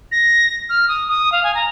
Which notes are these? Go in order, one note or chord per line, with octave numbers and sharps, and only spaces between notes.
A#6
F6
D#6
D#6
F5
G#5
A#5